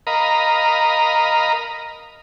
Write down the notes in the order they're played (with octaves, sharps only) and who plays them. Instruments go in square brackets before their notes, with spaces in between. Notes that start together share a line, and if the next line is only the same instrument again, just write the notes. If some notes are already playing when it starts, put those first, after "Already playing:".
[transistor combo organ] A#4 D#5 F5 A#5 B5